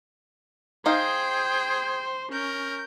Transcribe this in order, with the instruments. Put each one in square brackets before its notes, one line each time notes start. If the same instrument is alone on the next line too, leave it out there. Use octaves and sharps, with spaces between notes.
[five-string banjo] D#4 D#5 F5 [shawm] G#4 [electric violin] C5 [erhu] G5
[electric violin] C#4 [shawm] A#4 [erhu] G6